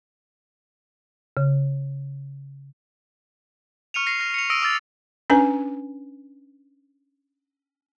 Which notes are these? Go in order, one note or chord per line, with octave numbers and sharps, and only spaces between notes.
C#3
C#6 F6 C#7 D#7 F7
F6 A#6 C7
F6 A#6
C#7 F7
D#6 E6 A#6 D7 D#7
D6 E6 F6 A6 A#6 D7
C#4 D4 B4 G#5